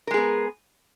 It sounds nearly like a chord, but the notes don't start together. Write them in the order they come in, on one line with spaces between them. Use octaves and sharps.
A#4 G#3 G#4 B3